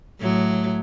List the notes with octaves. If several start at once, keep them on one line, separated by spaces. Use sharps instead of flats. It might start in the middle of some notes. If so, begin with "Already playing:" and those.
A2 F#3